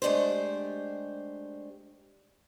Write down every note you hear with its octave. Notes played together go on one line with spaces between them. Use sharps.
G#3 A3 D4 G4 C5